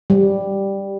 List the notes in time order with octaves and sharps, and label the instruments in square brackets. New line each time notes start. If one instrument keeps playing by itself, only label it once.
[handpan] G3